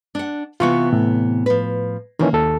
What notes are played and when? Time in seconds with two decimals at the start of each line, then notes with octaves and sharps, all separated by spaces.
0.15 D4 F#5
0.60 C3 E3 B3 F4 C#6
0.93 A2
1.46 F3 B4
2.19 D#3 E3 A#3 C#4
2.33 D#2 A4